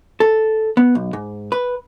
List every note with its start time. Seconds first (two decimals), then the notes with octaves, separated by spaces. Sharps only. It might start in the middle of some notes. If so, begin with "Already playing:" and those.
0.20 A4
0.77 B3
0.95 B1
1.13 G#2
1.52 B4